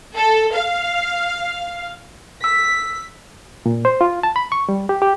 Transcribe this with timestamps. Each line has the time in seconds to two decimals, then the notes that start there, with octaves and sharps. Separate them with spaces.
0.14 A4
0.54 F5
2.44 E6 B6
3.66 A#2
3.85 C5
4.01 F4
4.23 A5
4.36 B5
4.52 C#6
4.69 G3
4.89 G4
5.02 G4